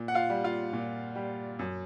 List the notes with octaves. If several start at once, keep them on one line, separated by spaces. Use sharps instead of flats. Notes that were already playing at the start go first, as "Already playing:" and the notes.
Already playing: A#2
F#5
F4 F5
G3
F4 F5
A#2
G3
F#2